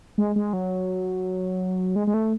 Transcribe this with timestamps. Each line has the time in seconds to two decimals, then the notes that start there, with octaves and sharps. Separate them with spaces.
0.18 G#3
0.36 G#3
0.53 F#3
1.96 G#3
2.07 G#3
2.14 A3